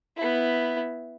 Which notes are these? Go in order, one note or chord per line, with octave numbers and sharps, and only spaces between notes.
B3 E4